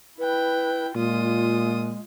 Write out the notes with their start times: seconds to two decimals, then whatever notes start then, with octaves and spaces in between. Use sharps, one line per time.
0.19 E4 B4 G5
0.95 A#2 G#3 F4 D#6